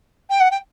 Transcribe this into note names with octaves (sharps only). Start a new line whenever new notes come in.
G5
F#5
G5